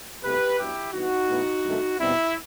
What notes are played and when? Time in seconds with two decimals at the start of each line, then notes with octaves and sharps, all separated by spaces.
0.23 C2 B2 A3 C4 G4 B4
0.58 G2 F#3 B3 E4 G4
0.93 G2 E3 B3 D#4 F#4
1.28 A2 E3 B3
1.64 G2 D#3 A3 C4
1.99 B2 G3 C4 E4